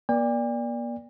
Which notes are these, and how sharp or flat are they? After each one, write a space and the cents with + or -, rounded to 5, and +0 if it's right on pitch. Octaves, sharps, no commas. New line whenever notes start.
A#3 +45 D5 +0 G5 +45